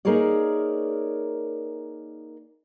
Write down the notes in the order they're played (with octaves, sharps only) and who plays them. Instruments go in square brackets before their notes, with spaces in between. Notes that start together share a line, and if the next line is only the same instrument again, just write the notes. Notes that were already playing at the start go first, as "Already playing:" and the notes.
[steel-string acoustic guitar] A#3 D#4 G#4 A#4 C#5 D5